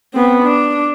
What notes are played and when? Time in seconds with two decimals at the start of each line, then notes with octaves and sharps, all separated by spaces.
0.14 B3 C4
0.43 D4